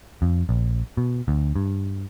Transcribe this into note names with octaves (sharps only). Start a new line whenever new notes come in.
F2
A#1
B2
D2
G2